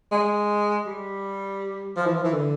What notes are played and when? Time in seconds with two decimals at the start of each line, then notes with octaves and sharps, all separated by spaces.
0.11 G#3
0.86 G3
1.96 F3
2.06 E3
2.16 F3
2.24 E3
2.33 D3